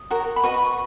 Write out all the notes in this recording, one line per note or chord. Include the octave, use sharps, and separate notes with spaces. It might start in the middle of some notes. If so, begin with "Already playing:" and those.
Already playing: D#6
F#4 A#4 C#5
B5
F#4 B4 D#5 C#6
B5
C#6